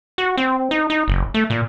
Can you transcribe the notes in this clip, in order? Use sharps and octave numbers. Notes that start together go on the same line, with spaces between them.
F#4
C4
D#4
D#4
F#1
A3
A#2